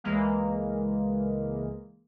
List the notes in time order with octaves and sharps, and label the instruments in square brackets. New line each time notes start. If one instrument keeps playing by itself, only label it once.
[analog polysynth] C#2 E3 G#3 A#3